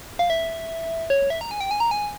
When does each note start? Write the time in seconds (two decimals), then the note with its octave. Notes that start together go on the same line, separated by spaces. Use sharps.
0.19 F5
0.30 E5
1.10 C#5
1.30 E5
1.41 A#5
1.51 G#5
1.61 G5
1.71 G#5
1.80 A#5
1.91 G#5